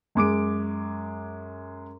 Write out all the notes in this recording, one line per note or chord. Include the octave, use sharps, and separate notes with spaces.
F#2 G#3 D6 D7